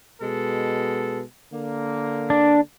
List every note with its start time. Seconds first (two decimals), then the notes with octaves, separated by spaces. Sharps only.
0.22 B2 G#3 A4
1.53 D3 A#3
2.30 D4